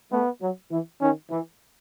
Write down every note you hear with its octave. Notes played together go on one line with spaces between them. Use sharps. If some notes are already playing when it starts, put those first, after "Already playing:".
A3 B3
F#3
E3
D#3 C#4
E3